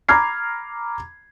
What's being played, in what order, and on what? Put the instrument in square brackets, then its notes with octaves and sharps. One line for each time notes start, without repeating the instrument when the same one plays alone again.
[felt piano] A#5 B5 D6 F6 G#6 C7